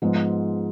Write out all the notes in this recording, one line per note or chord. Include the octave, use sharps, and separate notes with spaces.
G#2 F3 G#3 B3